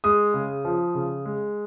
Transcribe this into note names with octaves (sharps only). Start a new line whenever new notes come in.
G#3 D#6
C#3
F3
C#3
G#3